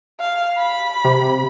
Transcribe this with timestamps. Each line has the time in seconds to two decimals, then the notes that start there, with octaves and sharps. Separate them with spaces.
0.20 F5
0.58 B5
1.05 C3